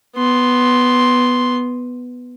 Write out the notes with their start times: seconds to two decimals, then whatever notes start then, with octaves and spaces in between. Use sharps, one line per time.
0.16 B3 C6